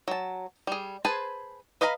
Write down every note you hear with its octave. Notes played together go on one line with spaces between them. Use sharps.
F#3 A5
G3 G#4
G#4 B4 C5 G#5 A5
B4 D#5 F5 A#5 B5